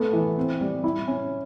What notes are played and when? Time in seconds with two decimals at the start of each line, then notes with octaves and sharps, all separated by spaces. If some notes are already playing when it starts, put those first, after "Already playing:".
Already playing: A3 B3
0.13 E3
0.37 C4
0.61 G3
0.84 E4
1.08 C#4